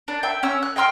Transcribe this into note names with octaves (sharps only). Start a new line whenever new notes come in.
D4
E5 G5
C#4 E6
F#6
D#5 G5 C6 F6